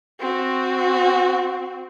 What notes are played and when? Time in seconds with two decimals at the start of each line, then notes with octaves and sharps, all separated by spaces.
0.20 C4 F#4